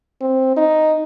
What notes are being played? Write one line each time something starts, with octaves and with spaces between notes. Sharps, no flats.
C4
D#4